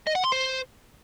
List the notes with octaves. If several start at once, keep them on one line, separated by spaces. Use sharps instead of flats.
D#5
F#5
C6
C5